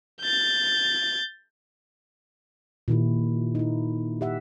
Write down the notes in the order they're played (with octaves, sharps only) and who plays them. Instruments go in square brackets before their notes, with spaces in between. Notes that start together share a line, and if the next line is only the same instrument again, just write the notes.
[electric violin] G6 A6
[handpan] A#2 D#3 E4 G4
D#4 E4
G4 E5 F#5